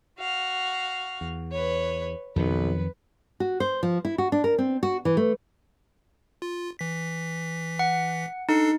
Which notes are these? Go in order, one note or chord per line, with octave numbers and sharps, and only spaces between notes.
F#4 F5
E2
B4 C#5
B1 F2 D#3 F#3 B4
F#4
C5
F3
E4
F#4
D4
A#4
C4
F#4
E3
A3
F4
E3 B6
F#5
D4 D#4 A4 C7